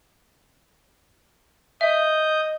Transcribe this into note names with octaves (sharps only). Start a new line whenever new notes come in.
D#5 E5 D#6 G6